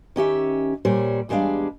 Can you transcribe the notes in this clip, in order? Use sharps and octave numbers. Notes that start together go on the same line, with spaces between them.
D#3 C#4 G4 E5
A#2 G3 C5 C#5
E2 G3 G#3 A#3 D4 F5